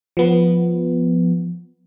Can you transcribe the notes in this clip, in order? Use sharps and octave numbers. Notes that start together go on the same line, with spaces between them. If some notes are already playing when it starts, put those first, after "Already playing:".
F3 B3